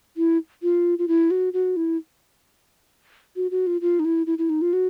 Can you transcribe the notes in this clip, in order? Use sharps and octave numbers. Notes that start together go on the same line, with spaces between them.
E4
F4
F4
E4
F#4
F#4
E4
F#4
F#4
F4
F4
D#4
E4
E4
E4
D#4
F4
F#4